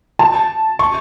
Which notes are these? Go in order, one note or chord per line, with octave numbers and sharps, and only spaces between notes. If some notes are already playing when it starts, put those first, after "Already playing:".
A5
C#6